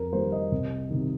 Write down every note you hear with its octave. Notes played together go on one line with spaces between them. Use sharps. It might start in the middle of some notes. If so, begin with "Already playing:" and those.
Already playing: F2 A#4
D#3 G3 A#3 C5
D#5
C2
C3 D#3